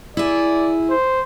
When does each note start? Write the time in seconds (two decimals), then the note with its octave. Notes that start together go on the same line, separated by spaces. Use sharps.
0.17 E4 G#4 D5
0.90 C5